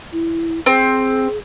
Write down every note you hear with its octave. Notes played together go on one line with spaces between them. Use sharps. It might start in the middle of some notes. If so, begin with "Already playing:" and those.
E4
C4 G#4